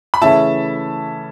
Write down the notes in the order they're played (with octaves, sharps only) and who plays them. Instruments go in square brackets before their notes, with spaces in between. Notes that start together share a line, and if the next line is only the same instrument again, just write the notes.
[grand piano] B5
[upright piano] C#3 E3 A3 C#4 [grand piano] E5 A5